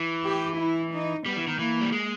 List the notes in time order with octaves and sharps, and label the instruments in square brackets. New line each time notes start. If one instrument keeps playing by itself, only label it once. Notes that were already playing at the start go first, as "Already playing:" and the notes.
Already playing: [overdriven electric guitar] E3
[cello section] G4
E4
D#4
[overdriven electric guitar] G3 [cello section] B3
[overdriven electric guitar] E3
D#3
[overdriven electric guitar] E3 [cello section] A#3
[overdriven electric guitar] G3
G#3